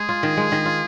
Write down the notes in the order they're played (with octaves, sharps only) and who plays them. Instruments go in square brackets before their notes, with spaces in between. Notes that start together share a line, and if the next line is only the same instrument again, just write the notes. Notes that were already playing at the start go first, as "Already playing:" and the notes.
Already playing: [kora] G#3 [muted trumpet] G#4
[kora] F4
D#3
G#3
D#3
F4